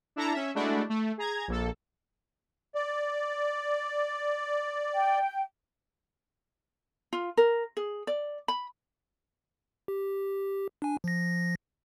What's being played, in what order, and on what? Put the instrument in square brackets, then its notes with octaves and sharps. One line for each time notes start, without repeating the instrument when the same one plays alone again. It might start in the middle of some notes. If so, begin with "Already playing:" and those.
[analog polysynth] D4 E4 A4 A5 A#5
C#4 E5
G#3 A3 D4 E4 F#4
A3
G#4 A#5 G#6
A#1 A#3 A4
[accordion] D5
[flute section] G5
[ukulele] F4
A#4
G#4
D5
B5
[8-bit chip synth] G4
D4 G#5
F3 A#6